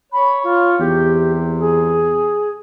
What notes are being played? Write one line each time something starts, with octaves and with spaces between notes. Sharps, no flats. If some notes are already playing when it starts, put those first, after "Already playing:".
C#5 B5
F4
E2 C3 G4
G#4